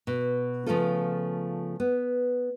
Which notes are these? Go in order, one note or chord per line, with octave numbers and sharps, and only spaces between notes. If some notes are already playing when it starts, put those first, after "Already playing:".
B2
C#3 F3 A3 B3 F4 A4
B3